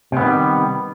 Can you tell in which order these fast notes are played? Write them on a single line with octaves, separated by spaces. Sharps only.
C3 B3 D#3 G3